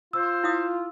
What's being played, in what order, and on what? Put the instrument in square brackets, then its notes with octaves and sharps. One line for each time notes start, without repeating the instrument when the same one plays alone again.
[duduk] F4 [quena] C5 [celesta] E6
[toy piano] E4 F5 D#6